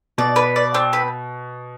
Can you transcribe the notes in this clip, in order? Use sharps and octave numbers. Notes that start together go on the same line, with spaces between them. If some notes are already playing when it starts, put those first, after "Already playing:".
B2 D5
B4
D5
C4
B4